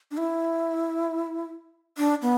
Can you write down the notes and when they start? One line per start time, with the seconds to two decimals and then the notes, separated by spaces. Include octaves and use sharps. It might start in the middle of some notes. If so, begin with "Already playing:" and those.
0.11 D4
0.17 E4
1.98 D4
2.22 B3